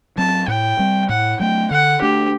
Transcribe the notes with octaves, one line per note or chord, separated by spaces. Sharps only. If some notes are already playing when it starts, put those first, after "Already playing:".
F#3 C4 A5
A2 G5
G3 C4
A2 F#5
F#3 A3 G5
D3 F#5
A3 D4 G4